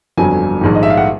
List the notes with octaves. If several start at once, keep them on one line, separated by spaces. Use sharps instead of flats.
G1 F2 D3 F#3 G#5
A#1 G#2 D#3
D#5
E5
F5
F#5